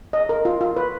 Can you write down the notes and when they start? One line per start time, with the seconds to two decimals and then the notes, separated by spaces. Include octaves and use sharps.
0.13 D#5
0.29 A#4
0.45 F4
0.61 F4
0.76 B4